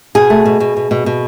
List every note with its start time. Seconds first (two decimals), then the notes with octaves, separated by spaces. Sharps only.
0.15 B2 G#4
0.30 A3
0.45 B2
0.60 B2
0.77 B2
0.91 B2
1.06 B2